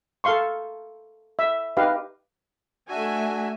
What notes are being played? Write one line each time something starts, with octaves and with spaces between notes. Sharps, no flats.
A4 A#4 F5 C6 C#6
E5
D#4 G4 B4 D#5 F5
A3 D4 F#4 E5 G#5